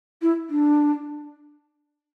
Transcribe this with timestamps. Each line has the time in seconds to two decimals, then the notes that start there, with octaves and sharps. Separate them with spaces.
0.22 E4
0.50 D4